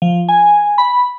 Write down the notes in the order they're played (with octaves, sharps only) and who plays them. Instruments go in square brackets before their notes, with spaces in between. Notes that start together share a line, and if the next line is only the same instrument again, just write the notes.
[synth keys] F3
G#5
B5